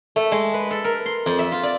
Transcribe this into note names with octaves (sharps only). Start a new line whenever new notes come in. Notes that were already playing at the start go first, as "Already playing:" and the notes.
A3
G#3
B4
A4
A#4
C6
F2
E5
F4
D5